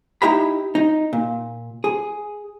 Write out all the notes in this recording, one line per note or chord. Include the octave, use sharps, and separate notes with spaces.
D#4 E4 G4 E5 A#5 B5
D#4
A#2
G#4